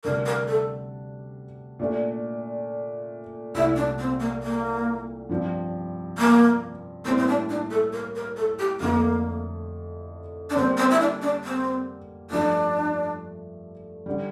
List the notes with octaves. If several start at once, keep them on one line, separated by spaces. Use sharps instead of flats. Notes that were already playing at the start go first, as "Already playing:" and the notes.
D2 C3 G3 D4 A#4
A#4
A4
A#2 A3 D4
C2 A#2 A3 E4
D4
C4
A#3
A#3
G2 F3 C4
A#3
A2 E3 G3 A#3 C4 E4
C4
D4
D4
A4
A#4
A#4
A4
G4
F2 D3 A3 A#3
D4
D3 G3 A#3 C4
C4
E4
D4
D4
C4
G2 F3 A3 D4
D3 G3